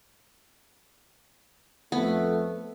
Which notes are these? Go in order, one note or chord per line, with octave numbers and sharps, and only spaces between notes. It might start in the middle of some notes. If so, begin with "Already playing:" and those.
F2 A3 B3